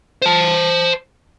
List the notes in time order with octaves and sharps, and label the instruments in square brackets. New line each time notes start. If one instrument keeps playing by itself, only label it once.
[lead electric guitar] C5 A5